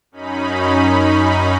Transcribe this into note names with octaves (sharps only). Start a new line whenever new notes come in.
F#2 C#4 D#4 B5